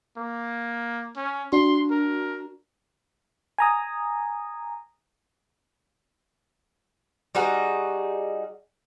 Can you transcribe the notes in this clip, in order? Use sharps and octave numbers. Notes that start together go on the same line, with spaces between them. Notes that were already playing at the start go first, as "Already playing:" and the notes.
A#3
C#4
D4 F#4 C6
A#4
G#5 A#5 D#6
G3 D#4 F#4 G#4